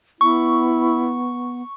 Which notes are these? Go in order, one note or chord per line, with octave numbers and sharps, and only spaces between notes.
B3 E4 C#6